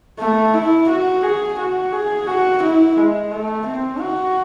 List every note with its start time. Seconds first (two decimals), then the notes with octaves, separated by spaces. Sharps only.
0.19 A3
0.53 E4
0.88 F#4
1.23 G#4
1.58 F#4
1.92 G#4
2.27 F#4
2.62 E4
2.97 G#3
3.31 A3
3.66 C4
4.00 F#4